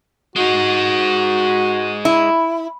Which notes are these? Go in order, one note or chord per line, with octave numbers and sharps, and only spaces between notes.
G#3 D#4 F#4
E4